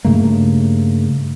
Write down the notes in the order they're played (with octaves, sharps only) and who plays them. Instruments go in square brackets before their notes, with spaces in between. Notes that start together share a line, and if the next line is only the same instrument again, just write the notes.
[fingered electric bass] G2 C#3 A3 A#3